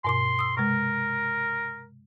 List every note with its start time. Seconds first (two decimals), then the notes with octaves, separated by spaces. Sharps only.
0.04 G2 B2 C6 D6
0.39 D#6 E6
0.57 C3 G#3 A#4